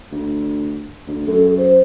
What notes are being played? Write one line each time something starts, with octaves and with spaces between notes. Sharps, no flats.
D2
D2
F#2 A4
C5